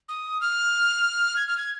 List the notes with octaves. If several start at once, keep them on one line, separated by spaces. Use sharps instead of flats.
D#6
F6
G#6
F6
G#6